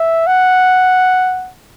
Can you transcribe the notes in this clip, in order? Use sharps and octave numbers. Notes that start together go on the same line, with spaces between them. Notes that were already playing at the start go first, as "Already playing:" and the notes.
Already playing: E5
F#5